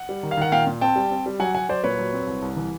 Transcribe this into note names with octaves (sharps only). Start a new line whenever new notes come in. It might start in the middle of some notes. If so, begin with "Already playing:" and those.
Already playing: F#5
G3
D#3
F5
D#3 F#5
A#2 F5 G5
A#2
C4 G5 A5
G3
C4
G3
F#3 F#5 G#5
F#3 F#5 G#5
F#3 C5 D5
A#2 B4 C#5
F#3
C4
C2
C2
E3